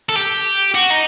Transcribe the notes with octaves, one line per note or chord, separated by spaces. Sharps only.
A4
G4
F#4
D#4